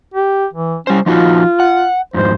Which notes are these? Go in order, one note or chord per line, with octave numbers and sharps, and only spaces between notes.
G4
E3
G3 C#4 C5
F3 D#4 F4 F#4
F#5
F2 G#2 C5